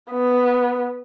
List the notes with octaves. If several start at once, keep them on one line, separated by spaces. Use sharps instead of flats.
B3